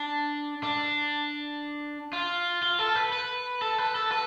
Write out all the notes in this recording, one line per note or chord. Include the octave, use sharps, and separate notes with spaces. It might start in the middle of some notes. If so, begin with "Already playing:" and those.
Already playing: D4
D4
F4
F4
A4
B4
B4
A4
B4
A4
B4